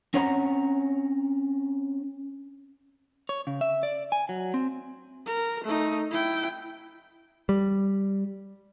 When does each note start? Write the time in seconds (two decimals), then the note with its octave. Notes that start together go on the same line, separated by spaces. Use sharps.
0.14 C4 C#4 C#5 F#5 G5 A#5
3.29 C#5
3.47 C#3
3.61 E5
3.83 D5
4.12 G#5
4.29 F#3
4.54 C4
5.27 A#4
5.64 A3 D#4
6.10 E4 G5
7.49 G3